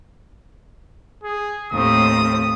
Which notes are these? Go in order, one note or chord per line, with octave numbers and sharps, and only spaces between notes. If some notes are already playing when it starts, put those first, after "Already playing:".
G#4
D#2 A2 C4 D#6